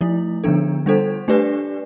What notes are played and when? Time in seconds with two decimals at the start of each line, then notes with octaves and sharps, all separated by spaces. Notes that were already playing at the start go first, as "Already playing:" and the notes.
0.01 F3 A3 E4
0.44 D3 F3 B3 D4 A4
0.86 G3 D4 A4 C5
1.28 A3 D4 G4 B4 D5